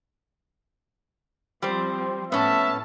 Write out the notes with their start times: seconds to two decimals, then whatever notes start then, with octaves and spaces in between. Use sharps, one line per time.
1.62 F3 G3 C4 C5
2.32 A2 B3 C#4 E5 A5